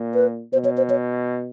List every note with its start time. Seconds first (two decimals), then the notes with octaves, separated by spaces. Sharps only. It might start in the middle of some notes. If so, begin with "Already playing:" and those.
Already playing: A#2
0.14 B4
0.52 B2 C5
0.65 C#5
0.77 C5
0.90 C#5